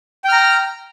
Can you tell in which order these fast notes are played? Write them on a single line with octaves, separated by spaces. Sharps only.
G5 F6 A#5